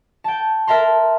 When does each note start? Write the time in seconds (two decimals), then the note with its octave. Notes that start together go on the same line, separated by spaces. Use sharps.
0.24 G5 A5
0.67 A#4 E5 A5 A#5 C6